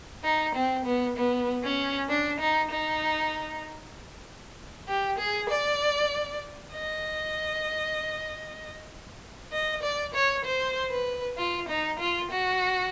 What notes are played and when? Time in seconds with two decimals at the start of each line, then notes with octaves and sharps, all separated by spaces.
0.24 D#4
0.55 C4
0.85 B3
1.17 B3
1.63 C#4
2.09 D4
2.40 D#4
2.71 D#4
4.88 G4
5.19 G#4
5.49 D5
6.73 D#5
9.52 D#5
9.82 D5
10.14 C#5
10.45 C5
10.91 B4
11.38 F4
11.69 D#4
11.99 F4
12.31 F#4